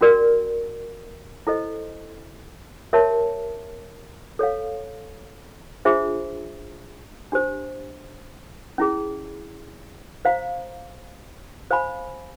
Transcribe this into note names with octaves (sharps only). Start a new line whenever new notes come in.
C#4 F#4 A#4 D5
E4 A4 C5 D#5
G4 A#4 C#5 E5 A5
A4 C#5 F5
D4 F4 G#4 C5 E5
D4 G4 C5
C#4 E4 G#4
C5 F5 A#5
C5 F5 G#5 B5